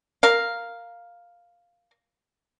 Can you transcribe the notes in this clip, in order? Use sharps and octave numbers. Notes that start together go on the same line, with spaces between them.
A#4 F5